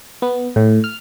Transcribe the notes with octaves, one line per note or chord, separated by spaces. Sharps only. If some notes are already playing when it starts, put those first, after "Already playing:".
B3
A2
F6